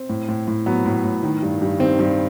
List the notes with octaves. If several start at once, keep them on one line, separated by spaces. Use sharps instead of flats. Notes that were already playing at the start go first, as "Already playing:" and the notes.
Already playing: C4
A2
A2
A2
F#3 B3
A2
A2
D#3
G2
G2
D#3 C4
G2